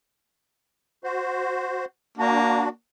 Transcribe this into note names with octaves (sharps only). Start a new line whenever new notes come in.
F#4 C5
A#3 D4 F#4